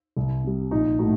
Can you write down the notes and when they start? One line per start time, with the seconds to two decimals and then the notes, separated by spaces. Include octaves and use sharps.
0.17 C2
0.44 C3 G3
0.71 A#1 D#4
0.99 A2 F#3 A3 D#4